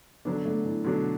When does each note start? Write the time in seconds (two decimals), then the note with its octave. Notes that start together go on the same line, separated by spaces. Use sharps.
0.25 D3 F#3 B3 D4
0.45 A3
0.65 E3
0.84 B2 D3 F#3 D4